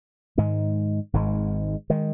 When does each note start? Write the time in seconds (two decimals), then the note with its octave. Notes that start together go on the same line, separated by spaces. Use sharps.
0.37 G#2 D#3 G#3
1.13 G#1 G#2 D#3 G#3
1.90 D#3 G#3